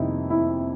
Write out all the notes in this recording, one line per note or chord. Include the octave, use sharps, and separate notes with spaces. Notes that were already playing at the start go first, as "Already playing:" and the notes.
Already playing: F2 C3 D#3 G3 D#4 E4
E4